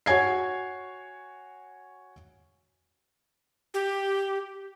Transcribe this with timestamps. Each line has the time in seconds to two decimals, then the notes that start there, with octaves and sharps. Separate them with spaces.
0.06 F#4 C#5 G#5 G#6 C7
3.74 G4